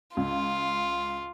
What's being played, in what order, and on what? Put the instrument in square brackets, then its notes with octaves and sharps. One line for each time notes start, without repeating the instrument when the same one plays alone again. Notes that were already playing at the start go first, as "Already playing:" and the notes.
[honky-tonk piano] C#2 [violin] F4